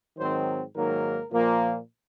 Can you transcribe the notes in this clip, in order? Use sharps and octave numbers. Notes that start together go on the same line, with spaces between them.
G#2 D#3 F#3 C4 C5
G#2 D#3 F#3 A#3 A#4
A#2 F3 A#3